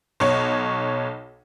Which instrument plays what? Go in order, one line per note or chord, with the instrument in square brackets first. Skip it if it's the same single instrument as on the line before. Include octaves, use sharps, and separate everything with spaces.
[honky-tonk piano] B1 C#5